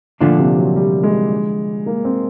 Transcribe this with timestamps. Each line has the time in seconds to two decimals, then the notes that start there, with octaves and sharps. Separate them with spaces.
0.21 A#2 D3 F3 A3 D4 F4
0.39 C3
0.58 F#3
0.76 G3
1.03 G#3
1.86 A#3
2.05 C4